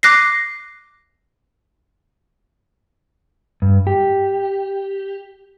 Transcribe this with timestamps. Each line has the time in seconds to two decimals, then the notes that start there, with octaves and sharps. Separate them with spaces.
0.03 D6 F#6 A#6 C7
3.62 G2
3.87 G4